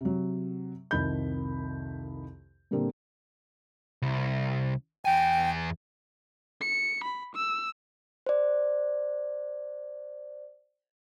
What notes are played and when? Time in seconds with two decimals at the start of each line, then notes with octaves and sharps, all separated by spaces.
0.01 C3 F#3
0.91 C2 F2 D#3 B5 G6
2.71 A#2 D3 G3 A#3 C4
4.02 C2
5.05 E2 G5 G#5
6.61 C#7
7.04 B5
7.35 E6
8.26 C5 D5